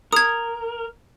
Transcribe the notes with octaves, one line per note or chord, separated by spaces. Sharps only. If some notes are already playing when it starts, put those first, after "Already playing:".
A#4 D#6 G#6